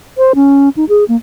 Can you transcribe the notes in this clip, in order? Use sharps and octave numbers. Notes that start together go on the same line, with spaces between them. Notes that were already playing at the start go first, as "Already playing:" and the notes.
C5
C#4
D#4
G#4
A#3